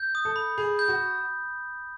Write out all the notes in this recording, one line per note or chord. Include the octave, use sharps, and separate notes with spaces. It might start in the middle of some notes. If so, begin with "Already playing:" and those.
Already playing: G6
D#6
A4
B5
G#4 B5
G6
F#4